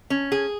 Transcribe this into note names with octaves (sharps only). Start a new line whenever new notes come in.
C#4
G#4